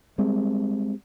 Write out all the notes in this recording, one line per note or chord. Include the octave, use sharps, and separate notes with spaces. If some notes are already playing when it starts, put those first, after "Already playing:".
G3 G#3 C4